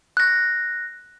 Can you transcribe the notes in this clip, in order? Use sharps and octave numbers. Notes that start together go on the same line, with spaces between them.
F#6 A#6